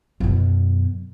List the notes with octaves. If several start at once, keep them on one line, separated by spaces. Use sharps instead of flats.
F#2 B2